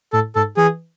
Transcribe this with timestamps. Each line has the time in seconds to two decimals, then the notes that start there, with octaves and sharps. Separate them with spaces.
0.13 A2 A4
0.35 G#2 A4
0.57 E3 G#4